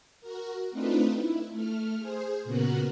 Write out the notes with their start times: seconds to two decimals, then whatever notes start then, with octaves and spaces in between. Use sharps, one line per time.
0.20 F#4 A#4
0.71 A3 C4 D4 D#4 F4 B4
1.14 E4
1.52 A3 F6
1.98 G#4 C5
2.44 A#2 C#3 B3 F#4 A#4 F#6